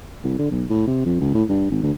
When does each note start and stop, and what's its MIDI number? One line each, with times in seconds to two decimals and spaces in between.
0.24 0.36 36
0.39 0.49 50
0.52 0.64 35
0.70 0.85 45
0.87 1.02 48
1.05 1.19 41
1.20 1.33 37
1.34 1.44 45
1.49 1.67 43
1.71 1.79 32
1.83 1.91 38